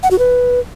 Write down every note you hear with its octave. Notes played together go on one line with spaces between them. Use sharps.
F#5
F#4
B4